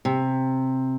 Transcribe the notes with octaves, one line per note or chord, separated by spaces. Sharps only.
C3